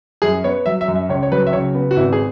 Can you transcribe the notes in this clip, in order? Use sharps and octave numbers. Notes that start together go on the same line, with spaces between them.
F#2 G#4
B3 C#5
F#3 E5
E5
F#2
E5
C#2 C#5
C#5
F#3 B4
E5
C#3 C#5
B3
F#4
G#1 E4
G#4